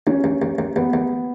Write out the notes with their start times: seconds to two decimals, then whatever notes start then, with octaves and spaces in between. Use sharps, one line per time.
0.07 D#2 C#4
0.24 D#2
0.42 D#2
0.59 D#2
0.76 D#2 B3
0.93 D#2